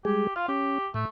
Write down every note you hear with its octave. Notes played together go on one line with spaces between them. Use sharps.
G3 G#3 G4 G#4
F4 F5
C#4 G4
A2 A3